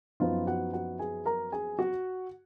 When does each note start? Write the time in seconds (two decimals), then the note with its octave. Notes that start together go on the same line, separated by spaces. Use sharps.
0.20 F#2 F3 B3 D#4 F4 F5
0.47 F#4 F#5
0.73 F#4 F#5
0.99 G#4 G#5
1.26 A#4 A#5
1.52 G#4 G#5
1.79 F#4 F#5